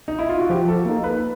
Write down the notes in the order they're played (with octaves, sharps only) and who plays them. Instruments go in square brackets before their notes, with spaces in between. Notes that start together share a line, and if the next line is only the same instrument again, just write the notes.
[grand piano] D#4
E4
F4
F#4
[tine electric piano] F3 [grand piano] G4
[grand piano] A4
[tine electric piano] A#3 [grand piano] A4
[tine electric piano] D#4
[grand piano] B4